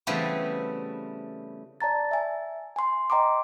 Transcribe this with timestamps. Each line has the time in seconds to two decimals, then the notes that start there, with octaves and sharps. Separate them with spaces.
0.07 C#3 E3 G3 A3 B3 C4
1.81 D5 A5 A#5 A6
2.11 E5 G#5
2.76 G#5 C6
3.10 D#5 G5 A#5 C6 D6